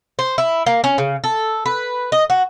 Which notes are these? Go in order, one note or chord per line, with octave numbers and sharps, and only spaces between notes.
C5
E4
A#3
C#4
C#3
A4
B4
D#5
F#4